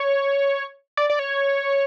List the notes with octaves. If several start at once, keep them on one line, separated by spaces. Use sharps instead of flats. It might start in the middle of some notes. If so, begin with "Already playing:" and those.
Already playing: C#5
D5
D5
C#5